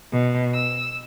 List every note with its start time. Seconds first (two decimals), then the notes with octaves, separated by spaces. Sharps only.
0.11 B2
0.53 E6